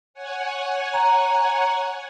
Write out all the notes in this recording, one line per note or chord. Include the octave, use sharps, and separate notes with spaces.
C#5 F#5 G#5
A#5